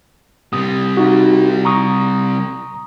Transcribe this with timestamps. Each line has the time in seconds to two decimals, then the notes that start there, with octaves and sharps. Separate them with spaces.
0.53 C3 G3 D#6
0.97 D#4 F#4
1.65 A#5 C#6 D#6